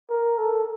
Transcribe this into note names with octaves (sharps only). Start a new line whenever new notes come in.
A#4
A4